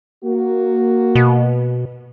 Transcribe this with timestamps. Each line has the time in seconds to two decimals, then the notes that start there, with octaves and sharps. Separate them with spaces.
0.24 A#3 F#4
1.15 B2